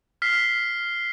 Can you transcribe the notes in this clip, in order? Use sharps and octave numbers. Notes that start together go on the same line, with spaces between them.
F6 B6 C7